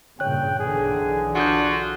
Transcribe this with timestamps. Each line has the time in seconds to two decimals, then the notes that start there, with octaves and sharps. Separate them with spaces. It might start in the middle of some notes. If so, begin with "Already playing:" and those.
0.20 G2 A#2 C#3 C#5 G5 F#6
0.59 B1 D3 E3 G#4
1.35 D4 F4 F#4 F#5 D#6 G6